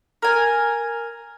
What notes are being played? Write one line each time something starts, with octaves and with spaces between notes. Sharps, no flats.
A#4 G#5